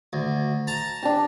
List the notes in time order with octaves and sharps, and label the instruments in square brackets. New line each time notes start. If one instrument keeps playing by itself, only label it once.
[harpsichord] D2
A5 A#5
[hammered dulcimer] D4 G4